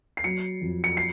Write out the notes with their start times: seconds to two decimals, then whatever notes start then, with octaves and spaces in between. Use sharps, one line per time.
0.17 C7
0.24 F#3 C#7
0.61 F2
0.84 C#7
0.97 C7